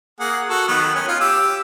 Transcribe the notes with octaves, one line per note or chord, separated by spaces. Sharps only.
A#3 G#4 F#5
F#4 A4
D#3 F#3 B3
C#4
F4
G4 E6